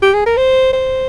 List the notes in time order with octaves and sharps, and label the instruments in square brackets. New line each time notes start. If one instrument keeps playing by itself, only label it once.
[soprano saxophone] G4
G#4
A#4
C5
C5